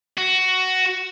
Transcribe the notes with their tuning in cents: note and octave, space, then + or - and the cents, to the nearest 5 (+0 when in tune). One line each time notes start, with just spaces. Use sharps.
F#4 +10